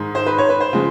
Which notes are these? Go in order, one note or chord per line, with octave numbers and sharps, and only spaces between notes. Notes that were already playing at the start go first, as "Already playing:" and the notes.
Already playing: G#2 D#3 G#3
C5
B4
C#5
B4
C5
C#3 F3 G#3